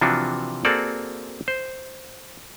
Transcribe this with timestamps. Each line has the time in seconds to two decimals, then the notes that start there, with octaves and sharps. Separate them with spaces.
0.01 C3 E3 F3 D4 F4 F#4
0.65 A#3 C4 F#4 G#4 A4 D5
1.48 C5